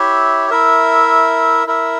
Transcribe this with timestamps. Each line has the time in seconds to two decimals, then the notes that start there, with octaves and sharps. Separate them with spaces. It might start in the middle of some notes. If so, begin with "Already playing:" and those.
Already playing: E4 G4 C#5 E5
0.50 E4 A#4 E5
1.67 E4 A#4 E5